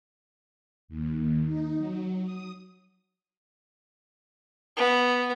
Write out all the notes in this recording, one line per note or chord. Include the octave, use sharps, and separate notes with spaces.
D#2
D#4
F#3
D#6
B3